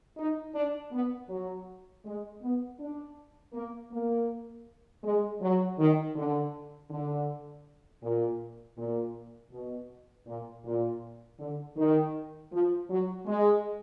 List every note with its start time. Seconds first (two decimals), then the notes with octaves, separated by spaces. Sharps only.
0.18 D#4
0.55 D4
0.92 B3
1.30 F#3
2.05 G#3
2.42 B3
2.79 D4
3.54 A#3
3.92 A#3
5.03 G#3
5.41 F#3
5.78 D#3
6.15 D3
6.91 D3
8.03 A#2
8.77 A#2
9.52 B2
10.27 A#2
10.65 A#2
11.39 D3
11.76 D#3
12.52 F3
12.89 F#3
13.26 G#3